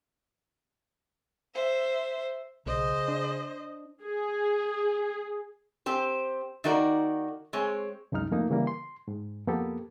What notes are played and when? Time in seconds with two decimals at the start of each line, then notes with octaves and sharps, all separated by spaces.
1.55 C5 E5
2.66 B1 C#3 C5 D#5
3.08 D4
4.02 G#4
5.86 C4 G4 C5
6.64 D#3 A#3 D#4 F#4 A#4 D5
7.53 G#3 C4 C#5
8.12 C2 F#2 G#3 D#4 F6
8.31 F2 A3 A#3 D#4
8.50 C#3 E3 G3 A#3
8.67 C6
9.08 G#2
9.47 F2 A#3 B3 G4 A4